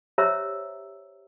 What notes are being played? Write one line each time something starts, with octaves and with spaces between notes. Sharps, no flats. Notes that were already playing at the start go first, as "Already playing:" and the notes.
G4 C5 C#5 E5 A#5 E6